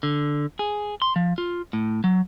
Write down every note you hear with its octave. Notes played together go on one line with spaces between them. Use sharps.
D3
G#4
C6
F3
F4
A2
F#3